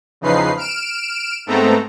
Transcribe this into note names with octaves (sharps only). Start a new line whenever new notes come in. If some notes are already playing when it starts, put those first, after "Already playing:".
E2 C#3 F3 D#4 B4 C7
F6 D7 E7
G#2 A3 B3 C4 A4 A#5